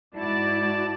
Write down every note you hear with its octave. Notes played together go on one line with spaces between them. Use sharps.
G#2 E4 F#4 D5 A5